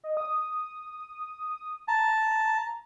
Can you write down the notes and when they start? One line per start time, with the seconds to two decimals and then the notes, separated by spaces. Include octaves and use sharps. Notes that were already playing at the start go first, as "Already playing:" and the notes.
0.04 D#5
0.17 D#6
1.88 A5 A#5